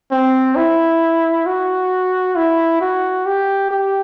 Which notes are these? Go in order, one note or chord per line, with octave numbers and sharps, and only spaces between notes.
C4
E4
F#4
E4
F#4
G4
G4